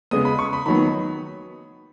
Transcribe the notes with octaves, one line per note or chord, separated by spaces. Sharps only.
C#3 G#3 B3 D#6
B5
C#6
B5
D#3 F#3 B3 B5